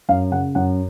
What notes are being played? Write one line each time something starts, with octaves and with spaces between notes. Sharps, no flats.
F#2 F5
C#3 F#5
F#2 F#5